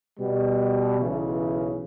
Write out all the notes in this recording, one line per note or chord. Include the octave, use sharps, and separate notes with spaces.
B2 G3
B1 C#3 E3